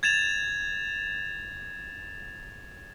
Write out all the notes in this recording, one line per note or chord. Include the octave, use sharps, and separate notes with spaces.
G#6 A6 E7 F7